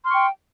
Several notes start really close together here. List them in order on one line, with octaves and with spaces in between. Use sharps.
C6 F6 C#6 G5